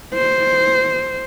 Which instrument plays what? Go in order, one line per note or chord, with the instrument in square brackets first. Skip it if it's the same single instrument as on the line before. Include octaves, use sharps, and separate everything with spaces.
[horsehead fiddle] C5